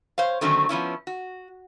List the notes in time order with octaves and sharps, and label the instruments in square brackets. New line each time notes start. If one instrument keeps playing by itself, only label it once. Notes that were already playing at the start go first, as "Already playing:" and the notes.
[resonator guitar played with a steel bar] C5 C#5 F5
D3 D#3 F#3 A3 C4 C#4
F3 B3 C#4 E4
F#4